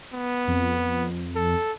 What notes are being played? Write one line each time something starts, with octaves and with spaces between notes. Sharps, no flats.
B3
F2
A4